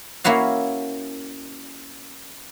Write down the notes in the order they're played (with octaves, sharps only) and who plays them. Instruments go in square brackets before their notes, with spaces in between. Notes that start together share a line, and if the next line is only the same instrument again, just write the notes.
[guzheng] A#3 C#4 E4 F#4 F5